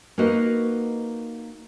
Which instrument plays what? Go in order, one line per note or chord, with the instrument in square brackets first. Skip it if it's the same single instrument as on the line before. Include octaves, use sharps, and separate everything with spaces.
[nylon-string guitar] A#3 D#4 F#4 A#4 B4 D#5